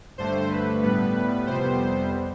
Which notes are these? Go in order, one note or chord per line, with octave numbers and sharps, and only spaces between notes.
G2 D3 A3 C5
B4
A2 G3 B3 B4
F2 C3 G3 B3 C5